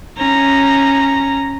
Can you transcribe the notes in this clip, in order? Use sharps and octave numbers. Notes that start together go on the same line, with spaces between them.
C#4 A#5